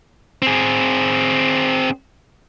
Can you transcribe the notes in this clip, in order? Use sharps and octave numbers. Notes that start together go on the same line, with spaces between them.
C4 G#4